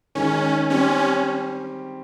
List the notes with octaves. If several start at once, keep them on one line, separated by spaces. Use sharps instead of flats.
D#3 G#3 C#4 D#4 G#4
G3 C4 C#4 G4